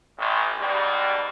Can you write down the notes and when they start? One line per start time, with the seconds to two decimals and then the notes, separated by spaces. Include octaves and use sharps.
0.18 A1
0.58 G#2 B2 G3